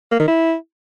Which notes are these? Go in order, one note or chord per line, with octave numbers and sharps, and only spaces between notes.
A#3
D#3
E4